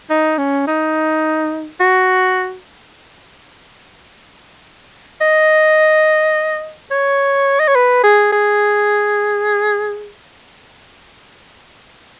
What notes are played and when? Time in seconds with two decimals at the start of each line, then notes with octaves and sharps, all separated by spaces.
0.10 D#4
0.38 C#4
0.67 D#4
1.80 F#4
5.21 D#5
6.91 C#5
7.60 D#5
7.68 C#5
7.75 B4
8.04 G#4
8.33 G#4